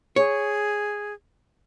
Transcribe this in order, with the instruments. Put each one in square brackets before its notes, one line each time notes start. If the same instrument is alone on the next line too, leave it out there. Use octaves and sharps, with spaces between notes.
[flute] G#4 [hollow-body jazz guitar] C#5